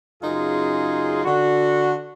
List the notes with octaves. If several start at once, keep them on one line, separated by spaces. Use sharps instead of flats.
F#2 C#3 D#4 F4 G#4 C6
D3 F#4